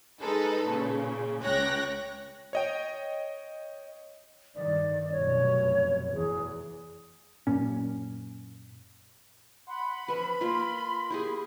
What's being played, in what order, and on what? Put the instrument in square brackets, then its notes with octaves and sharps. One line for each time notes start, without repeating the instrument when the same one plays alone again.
[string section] G#3 D#4 A4 B4
A#2 C#3
C#2 C#5 G5 F#6 A#6
[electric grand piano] C#5 D#5 G5
[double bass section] G2 D#3 [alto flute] D5
[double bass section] F1 F#2 B2 [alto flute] C#5
[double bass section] E2 [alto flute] G#4
[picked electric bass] F#2 A#2 C#4
[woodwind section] F#5 C6 [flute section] B5
[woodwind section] E3 F3 C#4 [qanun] B4 E5
[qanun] A#3 F4 [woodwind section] A#4 C6
[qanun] E4 G4 G#4